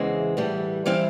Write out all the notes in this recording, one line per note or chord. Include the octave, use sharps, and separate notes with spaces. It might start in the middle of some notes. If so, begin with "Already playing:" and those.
Already playing: E2 C#3 E3 G#3 C4 F#5
A2 E3 G3
E3 G3 C4 E4 F5